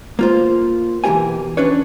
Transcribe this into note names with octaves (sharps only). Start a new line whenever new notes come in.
A#3 F4 C5
B2 E3 A#3 G4 A#4 G#5
C#4 D4 B4 C#5